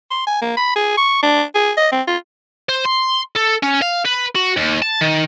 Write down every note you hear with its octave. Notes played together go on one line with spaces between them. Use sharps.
C6
G#5
A#3
B5
G#4
C#6
D4
G#4
D#5
C4
F4
C5
C6
A4
C#4
F5
B4
F#4
D#2
A5
D#3